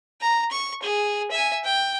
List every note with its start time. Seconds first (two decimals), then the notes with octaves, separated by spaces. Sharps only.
0.21 A#5
0.51 C#6
0.82 G#4
1.31 E5 G#5
1.64 G5